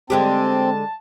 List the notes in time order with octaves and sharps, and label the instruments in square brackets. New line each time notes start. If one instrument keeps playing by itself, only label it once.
[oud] D3 G#3 G4 [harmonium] C4 [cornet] A5